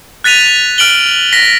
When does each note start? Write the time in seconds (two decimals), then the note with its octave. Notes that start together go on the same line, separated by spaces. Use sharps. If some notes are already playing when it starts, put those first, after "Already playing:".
0.24 F#6 A6 B6 D#7 F7
0.78 F6 D7 F#7 G7
1.33 A#6 B6